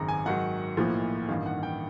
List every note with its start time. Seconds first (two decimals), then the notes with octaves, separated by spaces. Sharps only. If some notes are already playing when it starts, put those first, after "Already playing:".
Already playing: G#1 F#2 C#3 A#5
0.08 G#5
0.26 G#2 D#3 F#3 F#5
0.77 B1 A2 F3 A#3
1.29 A1 G2 D#3 F5
1.46 F#5
1.63 G5